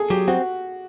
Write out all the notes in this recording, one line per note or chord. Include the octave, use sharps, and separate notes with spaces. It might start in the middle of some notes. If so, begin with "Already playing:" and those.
Already playing: G#4 A4
F#3 G4
C4 F#4